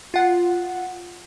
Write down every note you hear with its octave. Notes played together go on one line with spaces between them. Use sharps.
F4 F#5